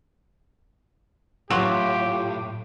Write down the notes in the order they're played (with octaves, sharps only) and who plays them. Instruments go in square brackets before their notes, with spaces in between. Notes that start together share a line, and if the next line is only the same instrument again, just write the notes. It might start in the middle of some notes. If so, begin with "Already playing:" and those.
[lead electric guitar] A2 [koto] F#3 [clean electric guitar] F4 [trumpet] G4